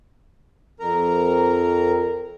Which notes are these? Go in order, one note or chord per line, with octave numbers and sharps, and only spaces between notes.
F2 A#4 A#5